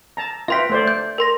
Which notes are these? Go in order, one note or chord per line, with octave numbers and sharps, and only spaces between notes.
A5 A#5
F4 B4 E5 G5 C6 B6
A3 C5 D5
G6
A#4 C6 A#6